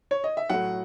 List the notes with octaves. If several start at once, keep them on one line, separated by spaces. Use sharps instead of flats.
C#5
D#5
E5
A2 F#3 F#5